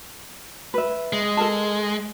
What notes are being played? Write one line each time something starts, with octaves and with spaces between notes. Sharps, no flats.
B4 E5
G#3
A4 A#4 A5